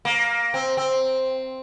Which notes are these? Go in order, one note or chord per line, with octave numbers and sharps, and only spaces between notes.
A#3
C4
C4